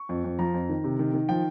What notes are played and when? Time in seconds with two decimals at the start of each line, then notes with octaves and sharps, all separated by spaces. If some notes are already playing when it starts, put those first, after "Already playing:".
Already playing: C#6
0.09 F2
0.24 F2
0.39 F3 A#5
0.54 F2
0.69 D#3
0.84 C3
0.99 D#3
1.14 D#3
1.29 F3 G5